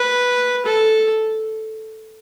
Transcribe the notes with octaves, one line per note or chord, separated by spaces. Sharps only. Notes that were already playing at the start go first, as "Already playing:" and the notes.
Already playing: B4
A4